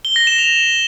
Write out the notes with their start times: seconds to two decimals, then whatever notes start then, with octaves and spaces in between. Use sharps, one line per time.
0.05 G7
0.16 A#6
0.27 E7
0.38 F7